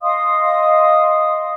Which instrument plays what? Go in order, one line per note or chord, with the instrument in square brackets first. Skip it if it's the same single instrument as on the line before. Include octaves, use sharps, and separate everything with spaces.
[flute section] D#5 F5 C6 D#6